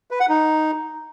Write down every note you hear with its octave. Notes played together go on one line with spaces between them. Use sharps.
B4
F#5
D#4